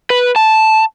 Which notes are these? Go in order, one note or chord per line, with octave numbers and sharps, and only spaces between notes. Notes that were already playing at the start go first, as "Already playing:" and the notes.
B4
A5